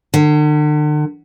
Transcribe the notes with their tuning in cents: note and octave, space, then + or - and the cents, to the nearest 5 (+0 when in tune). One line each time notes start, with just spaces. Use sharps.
D3 +40